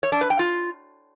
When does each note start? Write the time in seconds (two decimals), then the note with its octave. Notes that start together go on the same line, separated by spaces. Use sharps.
0.03 C#5
0.12 D4
0.21 B4
0.30 G5
0.39 F4